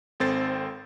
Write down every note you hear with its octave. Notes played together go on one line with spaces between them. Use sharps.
G#1 C4 A4 C5 A6